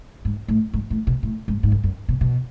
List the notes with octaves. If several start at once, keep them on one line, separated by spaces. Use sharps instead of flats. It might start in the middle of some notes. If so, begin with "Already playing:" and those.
G#2
A2
G#2
A2
B2
A2
G#2
G#2
F#2
F#2
B2
B2